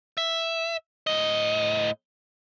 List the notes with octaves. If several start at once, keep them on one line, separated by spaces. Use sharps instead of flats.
E5
A2 D#5